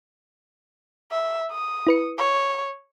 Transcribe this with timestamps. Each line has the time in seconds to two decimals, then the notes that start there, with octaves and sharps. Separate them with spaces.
1.12 E5
1.52 D#6
1.87 E4 B4 C#7
2.18 C#5